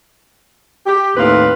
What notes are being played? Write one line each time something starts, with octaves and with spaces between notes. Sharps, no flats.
G4
D#2 A2 C4 B4 F5